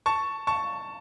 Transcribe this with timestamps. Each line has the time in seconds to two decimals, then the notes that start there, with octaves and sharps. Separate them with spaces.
0.06 A5 C#6
0.47 A5 C#6